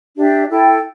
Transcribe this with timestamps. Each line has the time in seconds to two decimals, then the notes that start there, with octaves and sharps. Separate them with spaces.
0.16 D4 G4 E5
0.50 E4 A4 G5